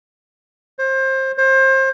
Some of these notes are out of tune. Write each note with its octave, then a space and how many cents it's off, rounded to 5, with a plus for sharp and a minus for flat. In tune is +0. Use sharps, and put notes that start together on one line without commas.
C5 +25
C5 +30